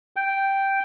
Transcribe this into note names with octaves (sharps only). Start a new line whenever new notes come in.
G5